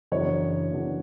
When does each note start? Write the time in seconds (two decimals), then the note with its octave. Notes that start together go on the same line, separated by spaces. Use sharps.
0.12 F#2 C#3 E3 B3 D4 C#5
0.72 F#2 C#3 E3 B3 D4